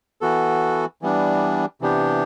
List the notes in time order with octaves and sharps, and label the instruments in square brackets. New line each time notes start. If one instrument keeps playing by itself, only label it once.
[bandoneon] E3 B3 F#4 A4
E3 G3 B3 D4
C3 E3 B3 D4 G4